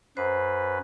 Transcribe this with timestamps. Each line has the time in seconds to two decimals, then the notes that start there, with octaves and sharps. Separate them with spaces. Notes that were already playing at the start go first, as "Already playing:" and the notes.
0.17 F#2 B4 C5